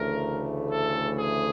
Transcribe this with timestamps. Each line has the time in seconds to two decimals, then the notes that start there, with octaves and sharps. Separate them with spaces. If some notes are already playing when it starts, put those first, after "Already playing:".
Already playing: D2 C#3 E3 A3 A#4
0.67 A4
1.15 G#4